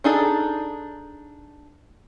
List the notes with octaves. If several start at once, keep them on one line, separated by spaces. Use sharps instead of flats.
D4 D#4 G#4 A4